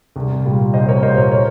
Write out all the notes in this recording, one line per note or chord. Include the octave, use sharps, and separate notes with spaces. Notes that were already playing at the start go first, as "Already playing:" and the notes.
C2
A#2 G3
C2 C5 D#5
A#4 C#5
A#2 G3 C5 D#5
A#4 C#5
A#4 C#5